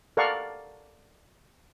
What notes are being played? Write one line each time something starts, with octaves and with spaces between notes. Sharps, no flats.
A4 A#4 D5 F5 F#5 C#6